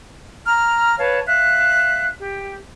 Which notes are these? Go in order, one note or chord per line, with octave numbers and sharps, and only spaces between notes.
A#5 F6
B4 C#5 F5 A5
E5 F5 F#6
G4